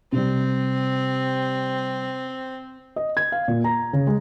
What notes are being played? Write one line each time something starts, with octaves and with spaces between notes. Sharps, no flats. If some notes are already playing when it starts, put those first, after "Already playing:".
C3 G3 C4
D#5
G#6
F5
A#2
A#5
C#3
G#3